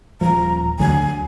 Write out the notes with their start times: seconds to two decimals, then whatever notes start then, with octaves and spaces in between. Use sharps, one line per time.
0.21 D#1 F3 A#5
0.79 D2 D3 F#3 G#5